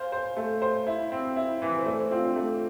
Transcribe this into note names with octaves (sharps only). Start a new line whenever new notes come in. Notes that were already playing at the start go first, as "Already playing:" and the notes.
Already playing: C5 F5 G#5
C5
A3
C5
E4
C4
E4
E3
C5
A3 D5
C5
C4 F4
D4
A3